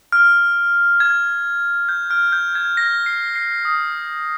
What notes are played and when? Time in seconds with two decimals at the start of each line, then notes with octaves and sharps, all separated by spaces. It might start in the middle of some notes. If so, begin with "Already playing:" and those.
0.12 F6
1.00 G#6
1.89 G6
2.10 F6
2.32 G6
2.55 G#6
2.77 A#6
3.06 C7
3.36 C7
3.65 D#6